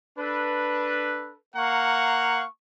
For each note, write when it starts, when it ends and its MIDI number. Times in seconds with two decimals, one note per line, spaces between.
0.19 1.35 62
0.19 1.35 69
0.19 1.35 71
1.56 2.44 58
1.56 2.44 77
1.56 2.44 78
1.56 2.44 82
1.56 2.44 85